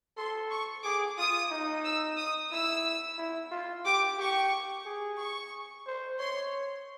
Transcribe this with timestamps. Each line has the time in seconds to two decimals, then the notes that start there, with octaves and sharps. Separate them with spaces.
0.17 A4 C6
0.50 C#6
0.83 G#4 D6
1.18 F4 D#6
1.51 D#4
1.84 E6
2.18 D#6
2.51 E4 E6
3.18 E4
3.51 F4
3.85 G4 D6
4.19 G4 C#6
4.86 G#4
5.19 C#6
5.86 C5
6.19 C#5 C6